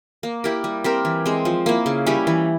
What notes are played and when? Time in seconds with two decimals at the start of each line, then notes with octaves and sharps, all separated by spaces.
0.23 A#3
0.44 E4 G4 A#4
0.64 G3
0.84 C4 G4 A#4
1.05 E3
1.26 G#3 C4
1.45 F3
1.66 A#3 E4
1.86 C#3
2.06 G3 C#4 E4
2.27 E3